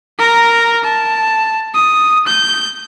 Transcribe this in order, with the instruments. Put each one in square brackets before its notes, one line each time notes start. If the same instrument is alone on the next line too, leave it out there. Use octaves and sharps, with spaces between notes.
[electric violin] A#4 A#5
A5
D#6
G6